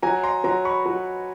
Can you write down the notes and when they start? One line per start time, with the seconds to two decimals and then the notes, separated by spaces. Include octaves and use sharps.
0.03 F#3 G#5 A#5
0.23 A#5 C6
0.44 F#3 A#5 C6
0.65 B5 C#6
0.86 F#3